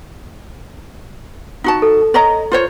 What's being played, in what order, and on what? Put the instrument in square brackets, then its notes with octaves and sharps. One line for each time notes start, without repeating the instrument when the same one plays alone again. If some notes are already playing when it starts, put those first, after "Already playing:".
[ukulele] D#4 F#4 A5
[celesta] A4
[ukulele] C#5 D#5 A#5
F4 C5 C#5